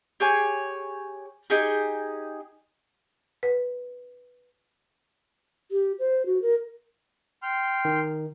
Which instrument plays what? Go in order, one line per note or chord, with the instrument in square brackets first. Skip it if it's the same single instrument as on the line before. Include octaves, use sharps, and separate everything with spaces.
[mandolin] G4 G#4 C#5 G#5
D#4 G4 G#4
[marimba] B4
[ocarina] G4
C5
F#4
A#4
[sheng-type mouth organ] G5 C6 F6
[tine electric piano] D#3